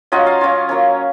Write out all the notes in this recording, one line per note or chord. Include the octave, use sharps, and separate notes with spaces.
F#3 C#4 F4 D#5 F#5
C#5 F5
F#3 C#4 F4
F#3 A#3 C#4